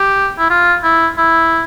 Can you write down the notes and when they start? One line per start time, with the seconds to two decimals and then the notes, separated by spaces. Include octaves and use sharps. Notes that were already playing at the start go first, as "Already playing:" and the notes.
Already playing: G4
0.38 E4
0.50 F4
0.84 E4
1.18 E4